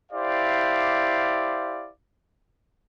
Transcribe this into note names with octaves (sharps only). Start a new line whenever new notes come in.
E4 G4 C5 D5 F5